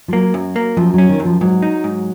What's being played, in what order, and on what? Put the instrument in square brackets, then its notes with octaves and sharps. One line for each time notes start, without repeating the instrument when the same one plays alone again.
[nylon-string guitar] F3
[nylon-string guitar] F#3 [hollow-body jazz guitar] A#3
[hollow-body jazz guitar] F#2
A#3
[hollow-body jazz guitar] F#2 [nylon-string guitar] F3
[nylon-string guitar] F#3 [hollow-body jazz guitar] C#4
[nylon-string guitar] D#3
[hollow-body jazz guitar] F#2
[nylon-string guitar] F3
[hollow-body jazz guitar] G#2 [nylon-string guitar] F#3
[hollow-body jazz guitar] D#4
G#2